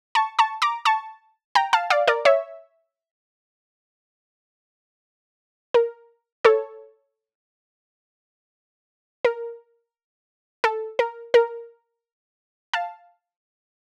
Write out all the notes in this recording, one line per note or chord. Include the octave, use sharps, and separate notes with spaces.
A5 C#6
A5 C#6
A#5 D6
A5 C#6
G5 A#5
F5 A5
D5 F5
A#4 D5
C#5 E5
A#4
A4 C#5
A#4
A4
A#4
A#4
F5 A5